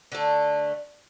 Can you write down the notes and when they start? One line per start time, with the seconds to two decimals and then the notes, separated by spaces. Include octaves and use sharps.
0.12 D3 A3